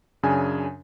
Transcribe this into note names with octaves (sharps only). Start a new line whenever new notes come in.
F#2 C#3 D4 G#5